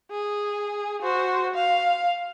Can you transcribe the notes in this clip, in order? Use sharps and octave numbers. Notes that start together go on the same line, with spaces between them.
G#4
F#4 C5
F5